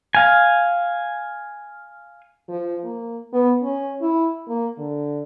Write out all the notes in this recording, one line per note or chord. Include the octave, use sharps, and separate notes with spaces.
F5 G#5
F3
A#3
B3
C#4
E4
A#3
D3